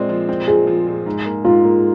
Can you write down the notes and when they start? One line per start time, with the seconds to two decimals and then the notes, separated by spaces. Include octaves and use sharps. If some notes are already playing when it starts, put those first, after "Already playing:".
Already playing: A#2 G#3 C4 D5
0.09 F3
0.29 C4
0.48 A#2 G#4
0.67 F3
0.87 A#2
1.06 G#2
1.26 A#3
1.45 G#2 F4
1.64 A#3